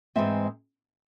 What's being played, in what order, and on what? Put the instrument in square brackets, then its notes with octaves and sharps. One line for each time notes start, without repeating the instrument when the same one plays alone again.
[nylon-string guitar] G#2 E3 G#3 C4 E5